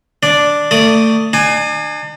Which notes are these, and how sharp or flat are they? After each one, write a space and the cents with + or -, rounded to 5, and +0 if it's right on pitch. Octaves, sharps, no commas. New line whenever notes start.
D4 +0 D5 +0
A3 +30 D5 +0 D#6 +0
D4 +45 G#5 +0